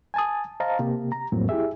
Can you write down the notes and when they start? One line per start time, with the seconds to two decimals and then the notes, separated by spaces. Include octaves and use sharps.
0.14 G#5 A5 D#6
0.60 C5 D#5 F5 A5 A#5
0.79 C3 A#3 G4
1.12 A#5
1.32 F2 A2 F#3 A#3 C4
1.49 E4 G4 G#4 E5